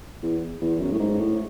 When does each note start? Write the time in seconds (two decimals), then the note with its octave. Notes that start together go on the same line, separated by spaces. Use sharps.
0.23 E2
0.61 E2
0.79 F#2
0.91 A2
0.99 G#2
1.18 A2